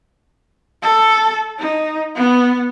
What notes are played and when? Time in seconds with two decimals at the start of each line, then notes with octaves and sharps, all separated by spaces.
0.82 A4
1.59 D#4
2.16 B3